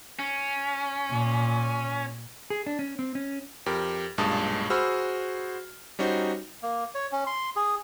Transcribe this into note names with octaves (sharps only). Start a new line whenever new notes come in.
C#4
A#2
G#4
D4
C#4
C4
C#4
F2 G4 A#4
B1 G2 A#2 G#3 A5 D#6
F#4 G#4 C5 B5 E6 F6
G3 C#4 D#4 F#4 C5
A#3
C#5
C#4
C6
G#4